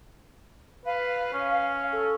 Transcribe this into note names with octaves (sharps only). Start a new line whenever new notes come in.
B4 F5
C#4
F5
A4